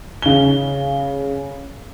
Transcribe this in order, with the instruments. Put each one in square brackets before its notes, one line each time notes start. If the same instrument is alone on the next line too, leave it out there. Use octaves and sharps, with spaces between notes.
[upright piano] C#3 G7